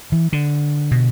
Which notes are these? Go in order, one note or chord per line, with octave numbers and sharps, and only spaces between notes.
E3
D3
B2